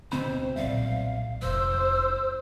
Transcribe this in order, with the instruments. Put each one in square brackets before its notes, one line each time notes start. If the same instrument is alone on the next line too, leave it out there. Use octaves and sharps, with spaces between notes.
[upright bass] D2 [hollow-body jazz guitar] B2 C4 B5 [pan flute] C5
[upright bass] B1 A#2 [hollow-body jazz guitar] D5 E5 [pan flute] F5
[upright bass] F1 [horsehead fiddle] C5 [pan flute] E6